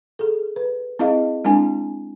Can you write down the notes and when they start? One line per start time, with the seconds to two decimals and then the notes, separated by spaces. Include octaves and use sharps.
0.19 G#4 A4
0.56 B4
0.99 C4 E4 G#4 D#5 F5
1.45 G#3 C4 D4 E4 G#5